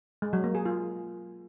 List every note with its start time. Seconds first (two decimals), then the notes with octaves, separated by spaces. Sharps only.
0.22 G#3
0.33 F#3
0.44 A#3
0.55 G#4
0.65 F4